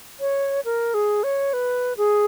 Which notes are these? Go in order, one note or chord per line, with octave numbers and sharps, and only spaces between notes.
C#5
A#4
G#4
C#5
B4
G#4